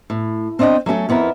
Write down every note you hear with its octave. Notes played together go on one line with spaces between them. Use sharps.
A2
C4 D4 D#5 F5 G5
F#3 A3 C#4 A4
F2 B3 E4 A#4